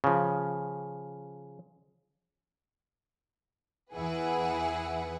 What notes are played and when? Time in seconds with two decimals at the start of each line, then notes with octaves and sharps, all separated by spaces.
0.04 C#3 F3
3.93 E2 E3 E4 G#4 B4 F#5